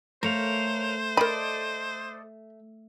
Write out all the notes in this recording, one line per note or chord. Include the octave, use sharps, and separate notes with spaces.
A3 A#4 C5 C#5 F5
A4 A#4 D5 D#5 B5